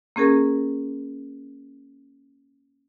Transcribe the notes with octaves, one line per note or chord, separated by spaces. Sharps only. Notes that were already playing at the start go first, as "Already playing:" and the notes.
A#3 C#4 G#4 A#4